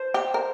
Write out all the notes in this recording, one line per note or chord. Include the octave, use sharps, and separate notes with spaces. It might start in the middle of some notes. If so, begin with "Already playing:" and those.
Already playing: C5
G4
A#4